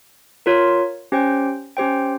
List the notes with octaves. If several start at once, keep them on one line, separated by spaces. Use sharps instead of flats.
F4 A#4 C#5
C#4 G4 C5 G5
C#4 G4 C5 G5